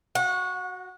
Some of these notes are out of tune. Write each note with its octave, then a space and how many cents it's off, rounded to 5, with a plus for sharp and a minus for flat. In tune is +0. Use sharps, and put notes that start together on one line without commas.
F#4 +0 F#5 -30